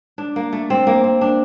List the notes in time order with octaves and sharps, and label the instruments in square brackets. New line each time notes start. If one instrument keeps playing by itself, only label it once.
[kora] D4
A#3
A3
C4
A#3
C4
D4